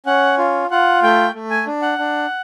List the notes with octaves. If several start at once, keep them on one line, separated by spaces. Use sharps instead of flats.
C#4 F#5
F4
F4 F#5
A3 G5
A3
G#5
D4
F#5
D4